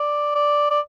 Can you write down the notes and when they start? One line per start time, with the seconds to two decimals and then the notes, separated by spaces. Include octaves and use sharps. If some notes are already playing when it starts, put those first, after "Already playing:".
Already playing: D5
0.35 D5
0.71 D5